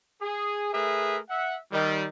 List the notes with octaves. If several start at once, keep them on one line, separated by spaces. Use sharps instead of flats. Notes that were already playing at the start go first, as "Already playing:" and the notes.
G#4
A3 G#4 A#4 B4 E5
E5 F#5
D#3 G3